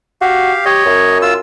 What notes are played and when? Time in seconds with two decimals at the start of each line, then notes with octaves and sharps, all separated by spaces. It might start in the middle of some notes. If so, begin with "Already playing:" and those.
0.21 F#4 G4 F5
0.65 G4 C#5 D#5
0.86 F#2
1.22 F4 E6